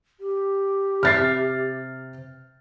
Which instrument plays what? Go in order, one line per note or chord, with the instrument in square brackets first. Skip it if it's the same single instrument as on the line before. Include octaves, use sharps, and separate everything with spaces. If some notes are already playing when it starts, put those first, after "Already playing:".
[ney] G4
[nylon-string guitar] C3 E5 [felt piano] F6 A6 C7